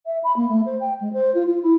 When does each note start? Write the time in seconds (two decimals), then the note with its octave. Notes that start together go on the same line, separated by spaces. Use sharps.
0.06 E5
0.24 B5
0.36 A#3
0.48 A3
0.66 C5
0.80 G5
1.01 G#3
1.13 C5
1.34 F4
1.47 F4
1.62 E4